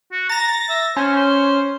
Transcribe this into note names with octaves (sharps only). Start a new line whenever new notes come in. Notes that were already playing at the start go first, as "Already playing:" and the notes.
F#4
A#5 A6 A#6
E5
C#4 C5
C5